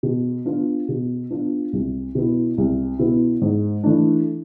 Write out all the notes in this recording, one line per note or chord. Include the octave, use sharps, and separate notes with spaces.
B2
B3 D4 F4
B2
B3 D4 F4
C2
B2 B3 E4
C2
B2 B3 E4
G#2
E3 A3 D4